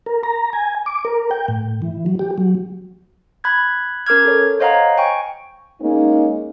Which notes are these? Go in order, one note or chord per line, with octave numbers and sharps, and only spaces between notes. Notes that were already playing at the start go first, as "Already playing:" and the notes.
A#4
A#5
G#5
D6
A#4
G5
A2
E3
F#3
G4
F#3
B5 F#6 G#6
C#4 A#4 D6 F6 G#6
A4 C#5
C5 C#5 D#5 F5 F#5 A#5
G5 G#5 C#6
G#3 A#3 C#4 D#4